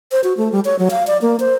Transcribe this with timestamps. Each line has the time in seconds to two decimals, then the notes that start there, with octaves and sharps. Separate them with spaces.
0.12 C5
0.24 F#4
0.37 A3
0.52 G3
0.65 C#5
0.79 F#3
0.91 F5
1.07 D5
1.22 A#3
1.40 C5